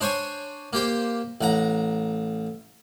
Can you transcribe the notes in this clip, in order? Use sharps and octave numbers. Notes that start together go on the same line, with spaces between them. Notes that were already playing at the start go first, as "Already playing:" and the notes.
D4 C5 C#5 G#5 C#6
A#3 G4 C5
A1 F#5 A#5